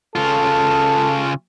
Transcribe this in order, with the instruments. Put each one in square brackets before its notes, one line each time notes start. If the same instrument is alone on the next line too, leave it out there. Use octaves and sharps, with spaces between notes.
[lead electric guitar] C#3 F4 [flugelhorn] A4